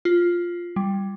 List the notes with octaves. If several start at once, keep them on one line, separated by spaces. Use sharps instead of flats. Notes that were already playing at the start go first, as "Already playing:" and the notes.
F4
G3